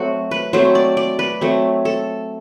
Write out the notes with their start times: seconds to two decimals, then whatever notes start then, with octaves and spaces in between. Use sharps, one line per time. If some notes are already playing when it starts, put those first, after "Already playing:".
Already playing: F#3 A3 C4 F#4
0.31 B4
0.53 F#3 A3 C4 C5
0.75 D5
0.97 D5
1.19 B4
1.41 F#3 A3 C4
1.85 A4